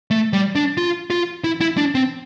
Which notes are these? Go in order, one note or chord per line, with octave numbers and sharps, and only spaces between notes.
A3
G3
D4
F4
F4
E4
E4
D4
C4